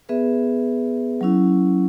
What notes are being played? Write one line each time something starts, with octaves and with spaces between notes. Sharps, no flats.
B3 G#4 B4 E5
F#3 C#4 E4